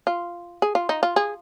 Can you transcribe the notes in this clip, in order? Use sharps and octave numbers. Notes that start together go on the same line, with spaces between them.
F4
G#4
F4
D#4
F4
G#4